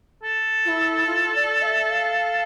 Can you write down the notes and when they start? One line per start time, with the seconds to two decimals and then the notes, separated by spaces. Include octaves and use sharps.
0.23 A4
0.65 F4
0.69 E4
1.07 F4
1.35 D5
1.62 F5
1.67 E5
1.90 F5